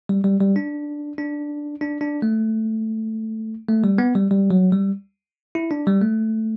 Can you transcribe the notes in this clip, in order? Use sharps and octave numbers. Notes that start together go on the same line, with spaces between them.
G3
G3
G3
D4
D4
D4
D4
A3
A3
G3
B3
G3
G3
F#3
G3
E4
D4
G3
A3